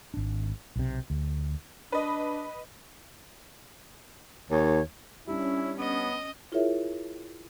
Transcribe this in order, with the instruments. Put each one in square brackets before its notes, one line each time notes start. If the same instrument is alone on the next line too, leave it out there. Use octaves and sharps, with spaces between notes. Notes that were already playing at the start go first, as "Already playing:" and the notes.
[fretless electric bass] G#1 D4
B1 C3
D2
[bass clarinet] D4 [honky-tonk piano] B4 D#5
[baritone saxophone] D#2 [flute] C#5
[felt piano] G3 D4 [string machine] C#4 [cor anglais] E4
[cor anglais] B3 [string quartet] D#5
[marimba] E4 F4 G#4 A#4 C#5 E5